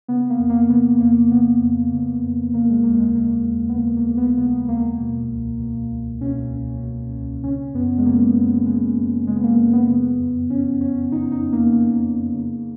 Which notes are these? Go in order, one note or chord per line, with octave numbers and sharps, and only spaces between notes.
C#3 B3
A#3
F2
A#3
C#3 B3
F2 A#3
C#3 B3
F2
C#3
F2
C#3 A#3
G#3
D#2 A#3
G#3
C#3 A#3
D#2
B3
C#3 A#3
A#3
D#2
B3
C#3 B3
D#2 A#3
B2
C#2
B2
C#2
B2 C#4
C#2
B2
C#2
C#3 C#4
F#2 B3
G#3
C#3 A#3
F#2
C#3 G#3
F#2
C#3 G#3
B3
A#3
F#2 G#3
B3
C#3
F2
C#3 C#4
F2 C#4
C#3 D#4
D#4
F2
A#3
C#3 A#3
F2
C#3